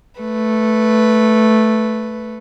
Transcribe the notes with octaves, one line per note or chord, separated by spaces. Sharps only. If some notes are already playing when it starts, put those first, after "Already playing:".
A3 B4